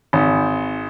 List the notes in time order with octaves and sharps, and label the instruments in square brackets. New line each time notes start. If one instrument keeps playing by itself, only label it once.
[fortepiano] G#1